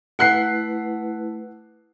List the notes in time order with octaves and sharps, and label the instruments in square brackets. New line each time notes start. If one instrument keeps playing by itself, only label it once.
[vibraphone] A3 E4 B4 [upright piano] F#5 F#6 C7